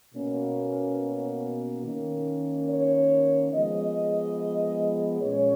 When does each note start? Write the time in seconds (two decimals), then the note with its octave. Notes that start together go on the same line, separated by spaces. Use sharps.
0.15 B2 A#3 C#4
1.84 D#3 A#3 C#4
2.68 C#5
3.53 F3 G#3 B3 D#5
5.21 A#2 G#3 C#4 C#5